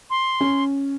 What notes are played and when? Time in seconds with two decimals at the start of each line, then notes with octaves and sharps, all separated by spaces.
0.10 C6
0.41 C#4